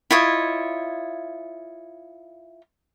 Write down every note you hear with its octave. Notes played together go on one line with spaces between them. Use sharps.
E4 F4 C#5 D#5